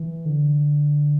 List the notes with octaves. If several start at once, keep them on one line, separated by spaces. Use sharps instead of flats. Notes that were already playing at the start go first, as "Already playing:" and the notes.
Already playing: E3
D3